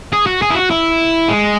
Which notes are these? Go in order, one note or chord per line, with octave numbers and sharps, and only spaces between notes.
G#4
F#4
G#4
E4
F#4
E4
G#3